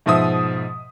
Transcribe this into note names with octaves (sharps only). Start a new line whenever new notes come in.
G#2 B2 F3 E5 D#6